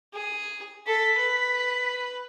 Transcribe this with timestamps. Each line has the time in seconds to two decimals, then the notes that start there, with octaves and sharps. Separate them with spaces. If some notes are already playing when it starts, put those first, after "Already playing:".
0.14 G#4
0.86 A4 B6
1.19 B4